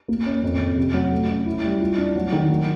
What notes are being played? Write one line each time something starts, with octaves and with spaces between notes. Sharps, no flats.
A#3
C#4
F2
F2
C3
F#3
A3
C#4
E4
G3
F4
D4
F#3
D#3
F#3